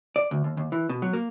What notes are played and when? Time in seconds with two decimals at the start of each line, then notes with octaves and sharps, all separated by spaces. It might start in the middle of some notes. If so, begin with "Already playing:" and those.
0.16 D5
0.31 D2
0.44 D#2
0.57 D#2
0.72 E3
0.89 B2
1.02 F#3
1.13 A#3